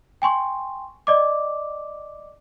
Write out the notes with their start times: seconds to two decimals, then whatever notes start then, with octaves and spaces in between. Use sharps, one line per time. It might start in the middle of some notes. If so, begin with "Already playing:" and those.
0.22 G5 G#5 C6 C#6
1.07 D5 D#5 D6